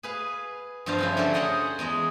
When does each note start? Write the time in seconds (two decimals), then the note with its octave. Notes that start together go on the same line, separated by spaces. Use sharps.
0.03 G#4 B4 F5
0.86 G2 F3 C4 C5 F5
0.98 C#3 F3 E4
1.17 D3 F#3 C#4 G4 A4
1.34 G#4 C5 D#5 F#5
1.79 E2 G#3 D#5